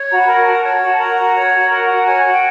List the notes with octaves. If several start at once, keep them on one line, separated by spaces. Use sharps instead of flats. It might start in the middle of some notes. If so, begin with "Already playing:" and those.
Already playing: C#5
F#4 A#5
B5
A#4
F#4 A5
C#5
A5
F#4
A#4 A#5
F#4
C#5
F#4
A#4
F#4
C#5 G#5
F#4
G5